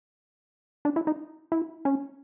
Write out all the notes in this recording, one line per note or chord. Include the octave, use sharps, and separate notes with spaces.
D4
E4
D#4
E4
C#4